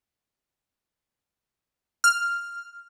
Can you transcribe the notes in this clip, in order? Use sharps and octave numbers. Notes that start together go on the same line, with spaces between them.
F6